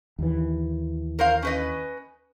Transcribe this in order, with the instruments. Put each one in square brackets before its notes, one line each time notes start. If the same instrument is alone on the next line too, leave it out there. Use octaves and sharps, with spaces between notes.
[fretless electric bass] D#2 E3
[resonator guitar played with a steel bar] A#4 C5 F5
C#4 B4 D#5